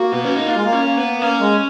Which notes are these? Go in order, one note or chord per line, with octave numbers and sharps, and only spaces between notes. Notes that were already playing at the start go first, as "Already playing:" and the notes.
Already playing: A#3 F#4
B3
C#4
D#4
A#3 F4
G#3
A#3
C#4
A#3
B3
A#3 C#4
G#3